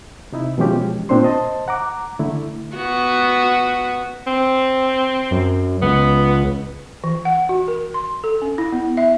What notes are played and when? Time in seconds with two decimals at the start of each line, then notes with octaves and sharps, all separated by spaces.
0.32 C3 D#4 E4
0.58 B2 E3 F3 G#3 C#4 G4
1.09 A#2 C4 D4 C5 C6
1.23 C5 D#5 A5 C6
1.68 F#5 A#5 D6
2.19 D3 A3 E4
2.76 B3 F#4
4.27 C4
5.31 F#2
5.82 C#2 B3
7.04 E3
7.25 F#5
7.49 F#4
7.68 A#4
7.94 C6
8.24 A4
8.42 C#4
8.58 E4
8.72 B3
8.97 E5